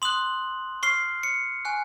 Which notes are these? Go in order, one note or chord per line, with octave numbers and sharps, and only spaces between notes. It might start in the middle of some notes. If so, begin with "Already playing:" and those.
C6 D#6 F#6 F#7
C#6 F6 C7
C#7
G#5 C#6 F#6